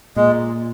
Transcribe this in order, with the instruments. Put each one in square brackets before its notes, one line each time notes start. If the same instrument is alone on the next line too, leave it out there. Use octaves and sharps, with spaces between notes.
[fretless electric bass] A#2 [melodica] G#3